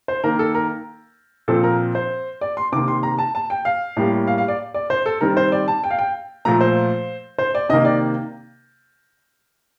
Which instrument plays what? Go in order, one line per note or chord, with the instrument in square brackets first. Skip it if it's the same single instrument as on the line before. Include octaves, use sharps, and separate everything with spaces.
[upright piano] C5
D#3 A#3 A#4
A4
A#4
A#2 F3 C4 A4
A#4
C5
D5
C6
C3 D#3 A#3 D6
C6
A#5
A5
A5
G5
F5
A2 G3 A#3
F5
F5
D5
D5
C5
A4
D#3 G3 C4 A#4
C5
D5
A5
G5
F5
G5
A#2 F3 A3 A#5
C5
C5
D5
C3 D#3 A#3 D#5
D5